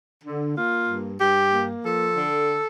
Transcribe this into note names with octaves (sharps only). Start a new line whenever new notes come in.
D3
A#3 F4
G2
G2 G4
A#3
F3 A4
D3